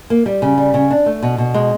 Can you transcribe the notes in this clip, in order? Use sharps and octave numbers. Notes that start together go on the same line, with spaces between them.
A#3
G3
C#3
G3
C#3
D4
A3
B2
B2
G#3